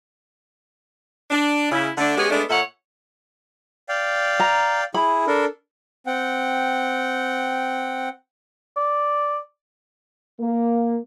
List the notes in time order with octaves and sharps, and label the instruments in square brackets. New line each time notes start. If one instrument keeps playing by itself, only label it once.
[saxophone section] D4
C#3 E4
D3 A3 D4
G#3 B3 C#4 G4 G#4
G#3 A3 B3 D4
A#2 A4 C#5 E5 F#5
[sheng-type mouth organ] D5 F5 G5
[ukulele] A#5
[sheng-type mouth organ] E4 G#4 [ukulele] B5
[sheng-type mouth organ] D4 A4 A#4
C4 F#5 G5
[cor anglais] D5
[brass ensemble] A#3